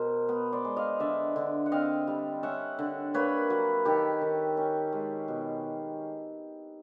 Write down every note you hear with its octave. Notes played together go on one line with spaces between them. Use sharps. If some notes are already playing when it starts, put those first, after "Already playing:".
Already playing: B2 A#4 C5
B3
C5 D5
G#3
D#5 F5
D3 D5 E5
D3
F#5
C4 D#5 F5
G3
C#4 E5 F#5
D3
A#3 B4 C#5
F#3
D#3 G4 A4
D#3
C#4
G#3
B2